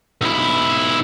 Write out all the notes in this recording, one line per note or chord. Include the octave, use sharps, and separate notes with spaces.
B1 E4